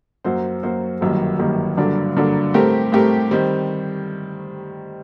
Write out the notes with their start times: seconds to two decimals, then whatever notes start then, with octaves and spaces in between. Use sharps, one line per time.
0.24 F#2 F#3 A#3 F#4 C5
0.63 F#2 F#3 A#3 F#4 C5
1.01 G1 F#2 D#3 G3 A#3
1.39 G1 F#2 D#3 G3 A#3
1.77 G2 D3 F#3 A#3 D4
2.17 G2 D3 F#3 A#3 D4
2.54 A2 A3 C4 G4 A#4
2.92 A2 A3 C4 G4 A#4
3.31 D#3 G3 C4